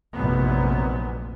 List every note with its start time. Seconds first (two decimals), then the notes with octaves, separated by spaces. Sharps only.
0.15 F1 A#1 F#2 A#2 B3